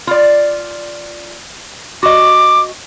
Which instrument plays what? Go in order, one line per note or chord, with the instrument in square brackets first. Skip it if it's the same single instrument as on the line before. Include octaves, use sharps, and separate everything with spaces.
[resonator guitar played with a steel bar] F4 D5
[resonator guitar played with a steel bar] F#4 D#5 [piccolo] D6